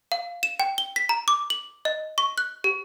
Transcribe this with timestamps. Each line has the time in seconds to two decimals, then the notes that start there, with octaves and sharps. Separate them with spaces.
0.12 F5
0.43 E7
0.60 G5
0.78 G7
0.96 B6
1.09 A#5
1.28 D6
1.50 F#7
1.85 D#5
2.18 C#6
2.38 F#6
2.64 G4